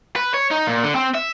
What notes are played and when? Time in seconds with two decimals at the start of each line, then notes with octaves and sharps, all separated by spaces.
0.16 B4
0.34 C#5
0.51 D#4
0.67 A#2
0.83 D3
0.96 C4
1.15 E5